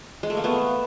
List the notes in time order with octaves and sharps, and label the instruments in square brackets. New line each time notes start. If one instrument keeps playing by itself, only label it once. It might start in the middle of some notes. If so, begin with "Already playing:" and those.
[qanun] G#3
A3
A#3
A3 B3